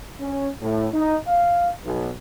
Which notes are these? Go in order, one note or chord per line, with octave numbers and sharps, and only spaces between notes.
C#4
A2
D#4
F5
B1